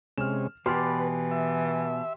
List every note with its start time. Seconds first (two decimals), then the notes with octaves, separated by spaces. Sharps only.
0.18 C3 G#3 C#4 F6 E7
0.66 B2 E3 G4 B4 D5 C6 F6
1.31 E5